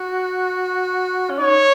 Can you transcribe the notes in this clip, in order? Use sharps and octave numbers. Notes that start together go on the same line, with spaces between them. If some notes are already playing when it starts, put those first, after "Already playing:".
Already playing: F#4
C#4
D#4 C#5